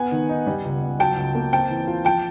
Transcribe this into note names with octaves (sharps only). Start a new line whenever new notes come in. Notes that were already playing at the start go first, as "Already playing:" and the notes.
Already playing: B3 F#5 G#5
D#3
D#4
G3
C#2
C#2
F#3 G5 A5
C#2
A#3
C4 G5 A5
E3
F4
F3 G5 A5